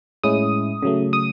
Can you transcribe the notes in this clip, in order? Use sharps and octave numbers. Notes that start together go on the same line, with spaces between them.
A2 G#3 C#4 E4 D#6
C#3 F#3 A3
D#6